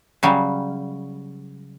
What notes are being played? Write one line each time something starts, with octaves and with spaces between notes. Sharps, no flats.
C#3 F#3 G3